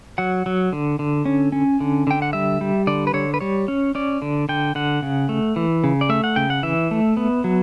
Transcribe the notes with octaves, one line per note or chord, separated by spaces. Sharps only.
F#3 F#5
F#3
D3
D3
C#4
C#4
D3
D3 G5
F#5
G3 E5
G3
D3 D5
B4
D3 C#5
B4
G3 C#5
C#4
C#4 D5
D3
D3 G5
D3 F#5
C#3
A3
E3
C#3
D5
A3 E5
F#5
C#3 G5
F#5
E3 E5
A3
B3
F#3